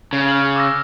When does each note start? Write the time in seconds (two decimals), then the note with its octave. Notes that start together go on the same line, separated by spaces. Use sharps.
0.13 C#3
0.29 F6 F#7
0.56 D6 E6 A#6